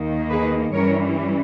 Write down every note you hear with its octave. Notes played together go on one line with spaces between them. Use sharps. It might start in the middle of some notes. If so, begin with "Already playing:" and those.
Already playing: D#2 D#3 A#3 D#4
G#4 B4
G2 E3 G3 C#4 A#4 C#5